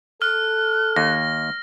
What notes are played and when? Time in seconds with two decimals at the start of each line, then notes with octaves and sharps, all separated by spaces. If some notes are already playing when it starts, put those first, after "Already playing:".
0.22 A4 F6 F#6
0.96 D#2 A#6